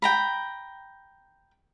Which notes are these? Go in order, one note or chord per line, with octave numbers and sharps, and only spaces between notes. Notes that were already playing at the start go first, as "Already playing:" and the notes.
G5 A#5 B5